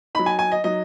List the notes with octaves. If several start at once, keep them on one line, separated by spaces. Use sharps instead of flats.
F#3 D#4 B5
G#5
G#5
D#5
F#3 D#4 D#5